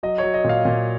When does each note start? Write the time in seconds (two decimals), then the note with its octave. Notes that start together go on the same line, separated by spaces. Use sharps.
0.03 F#3 D#5
0.18 F#3 C#5
0.34 D#5
0.44 A#2 F5
0.65 A#2